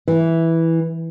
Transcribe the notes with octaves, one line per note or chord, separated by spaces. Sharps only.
E3